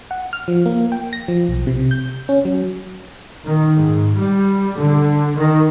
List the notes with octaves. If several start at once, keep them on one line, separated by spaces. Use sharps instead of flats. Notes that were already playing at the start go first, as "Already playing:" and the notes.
F#5
F6
F3
A#3
G5
A#6
F3
B1
C3
G6
C#4
F#3
D#3
G#2
G3
D3
D#3